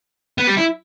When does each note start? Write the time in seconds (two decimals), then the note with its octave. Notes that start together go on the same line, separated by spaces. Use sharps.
0.38 B3
0.47 G3
0.57 E4